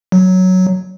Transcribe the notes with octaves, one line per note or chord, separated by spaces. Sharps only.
F#3